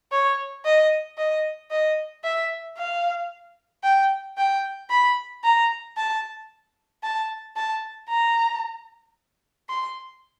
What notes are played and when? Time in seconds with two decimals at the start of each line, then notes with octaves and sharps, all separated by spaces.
0.12 C#5
0.65 D#5
1.18 D#5
1.71 D#5
2.25 E5
2.78 F5
3.84 G5
4.38 G5
4.90 B5
5.44 A#5
5.97 A5
7.03 A5
7.56 A5
8.10 A#5
9.70 C6